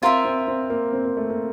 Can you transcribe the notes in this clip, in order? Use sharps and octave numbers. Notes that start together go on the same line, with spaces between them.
C4 F4 A#4 E5
C4
C4
A#3
C4
A#3
A3
A#3